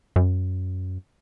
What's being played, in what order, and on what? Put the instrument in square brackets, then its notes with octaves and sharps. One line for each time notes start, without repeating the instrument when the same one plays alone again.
[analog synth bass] F#2